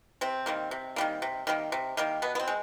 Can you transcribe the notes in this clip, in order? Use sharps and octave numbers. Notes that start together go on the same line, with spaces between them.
C3 C4
D#3 G3 A#3
C3
D#3 G3 A#3
C3
D#3 G3 A#3
C3
D#3 G3 A#3
B2 B3
B3
C4
G#3